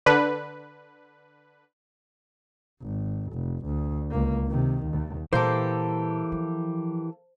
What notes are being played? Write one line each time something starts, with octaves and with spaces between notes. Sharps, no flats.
D3 B4
G#1
F1
D2
C#2 A#3
C3 D#3
D#2
A#2 E3 G3 A#3 G4 A4 C5
F3